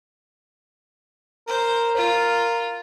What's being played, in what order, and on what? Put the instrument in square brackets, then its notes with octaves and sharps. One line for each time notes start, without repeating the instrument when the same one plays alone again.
[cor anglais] A#4 [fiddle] C5
[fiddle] F4